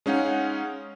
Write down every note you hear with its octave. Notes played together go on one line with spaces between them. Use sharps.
G#3 C#4 D#4 F5 F#5